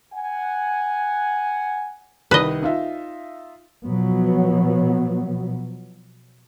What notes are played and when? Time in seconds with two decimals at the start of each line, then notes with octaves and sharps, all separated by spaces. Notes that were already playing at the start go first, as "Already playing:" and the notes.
0.14 F#5 G#5
2.31 C2 D#3 B4 D#5
2.63 D#4 F4 E5
3.86 B2 F3 F#3 B3